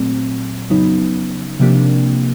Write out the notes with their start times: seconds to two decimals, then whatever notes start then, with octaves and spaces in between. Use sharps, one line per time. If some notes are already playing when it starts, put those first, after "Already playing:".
Already playing: A#2 F#3 A3 C4
0.70 F2 C#3 F#3 B3 D#4
1.60 C3 F3 A#3 D4 G4